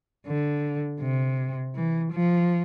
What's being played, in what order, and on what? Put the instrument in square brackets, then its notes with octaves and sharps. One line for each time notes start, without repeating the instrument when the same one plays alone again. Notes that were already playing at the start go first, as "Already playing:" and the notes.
[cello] D3
C3
E3
F3